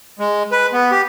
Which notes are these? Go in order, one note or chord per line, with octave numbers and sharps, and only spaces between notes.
G#3
B4
B3
G4